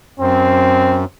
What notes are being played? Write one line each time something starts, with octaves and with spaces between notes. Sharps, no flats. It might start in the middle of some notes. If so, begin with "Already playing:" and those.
F#2 C4